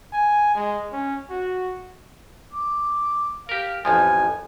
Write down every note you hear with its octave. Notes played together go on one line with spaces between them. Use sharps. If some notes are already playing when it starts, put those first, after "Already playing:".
G#5
G#3
C#4
F#4
D6
G4 A#4 F5
A1 F2 F3 G#5